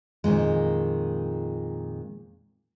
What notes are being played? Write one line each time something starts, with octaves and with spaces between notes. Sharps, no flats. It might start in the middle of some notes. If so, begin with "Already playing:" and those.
F2 A#2 D#3 G#3